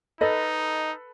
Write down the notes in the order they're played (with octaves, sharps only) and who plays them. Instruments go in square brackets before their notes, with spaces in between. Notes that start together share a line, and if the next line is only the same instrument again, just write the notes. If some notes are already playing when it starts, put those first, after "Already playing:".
[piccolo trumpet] D#4 [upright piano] A4 B4 B5 [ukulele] D#5